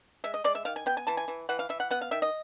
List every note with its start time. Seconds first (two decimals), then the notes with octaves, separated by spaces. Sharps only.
0.24 G#3 E5
0.34 D#5
0.44 G#3 D5
0.55 E5
0.65 D#3 F5
0.76 G#5
0.86 B3 G5
0.97 G#5
1.07 E3 A5
1.17 G#5
1.28 E3
1.49 E3 F#5
1.59 F5
1.69 E3 E5
1.80 F#5
1.91 B3 F#5
2.01 F5
2.11 D#3 E5
2.22 D#5